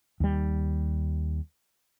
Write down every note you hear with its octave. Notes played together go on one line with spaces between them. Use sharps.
D#2 G3